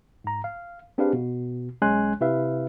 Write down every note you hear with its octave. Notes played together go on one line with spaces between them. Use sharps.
G#2 A#5
F5
C4 D4 G4 G#4 B4 F5
B2
B1 G#3 C#4 G#5 C6 F#6
C3 E4 B4 E5 F5